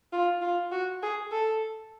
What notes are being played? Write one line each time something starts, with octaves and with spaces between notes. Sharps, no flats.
F4
F4
F#4
G#4
A4